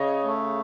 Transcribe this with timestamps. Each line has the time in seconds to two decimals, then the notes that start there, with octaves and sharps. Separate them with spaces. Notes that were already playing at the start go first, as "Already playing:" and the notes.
Already playing: C#3 C#5 D#5
0.24 A3